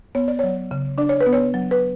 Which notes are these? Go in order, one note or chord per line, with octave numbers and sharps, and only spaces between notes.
B3 C#5
D5
F#3 C#5
C#3
D4 D5
C#5
B4
B3
C#5
F#3
B4